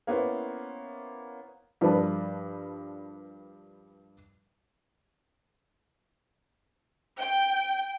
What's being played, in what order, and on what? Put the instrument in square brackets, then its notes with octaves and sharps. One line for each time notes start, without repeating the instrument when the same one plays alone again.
[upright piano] A#3 B3 C#4 E4 C5
[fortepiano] G2 F3 A#4 B4 D5 A5
[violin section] G5